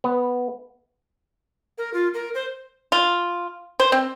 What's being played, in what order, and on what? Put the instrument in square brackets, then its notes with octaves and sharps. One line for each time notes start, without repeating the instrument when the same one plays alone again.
[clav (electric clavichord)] B3
[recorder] A#4
F4
A#4
C5
[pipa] F4
C5
C4